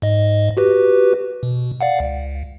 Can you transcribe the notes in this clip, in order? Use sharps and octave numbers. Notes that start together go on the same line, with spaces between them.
G#2 D#5
F#4 G4 B4
B2
D5 F5 F#5
C#2